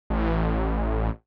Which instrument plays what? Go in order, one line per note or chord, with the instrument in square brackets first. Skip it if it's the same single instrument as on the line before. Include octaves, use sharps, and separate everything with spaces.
[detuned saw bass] A1